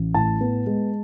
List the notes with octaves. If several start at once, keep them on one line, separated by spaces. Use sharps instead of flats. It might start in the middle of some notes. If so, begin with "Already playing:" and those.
Already playing: A1
A2 A5
B3
G#3